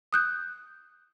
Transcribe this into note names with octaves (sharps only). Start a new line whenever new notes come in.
D#6 F#6 G6